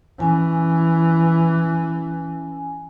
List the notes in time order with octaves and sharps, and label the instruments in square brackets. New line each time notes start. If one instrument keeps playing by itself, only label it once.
[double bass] E3 [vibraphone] C#4 G#5